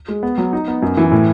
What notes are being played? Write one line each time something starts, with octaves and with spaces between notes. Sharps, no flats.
G#3
B3
F#3
D#4
B3
F#2
E3
A2